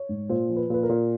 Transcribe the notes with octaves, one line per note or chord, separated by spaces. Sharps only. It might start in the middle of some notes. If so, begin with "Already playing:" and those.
Already playing: C#5
G#2
A#2 C5
F3
B4
A#2 B4
A#4
A#2